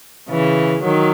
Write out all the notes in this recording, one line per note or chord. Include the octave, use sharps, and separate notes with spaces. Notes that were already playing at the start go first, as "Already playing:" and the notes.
C#3 E3
D#3 F#3